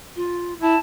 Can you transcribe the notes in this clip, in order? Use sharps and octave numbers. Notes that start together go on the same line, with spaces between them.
F4
E4 A5